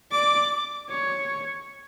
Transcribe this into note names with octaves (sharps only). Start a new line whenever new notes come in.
D5 D6
C#5